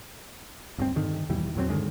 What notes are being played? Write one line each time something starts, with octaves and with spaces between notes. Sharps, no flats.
D1 G2 C4
G2 D3 D#3
D#2 B2 E3 G3
E2 A#2 F#3 C4
G2 D3 D#3 G#3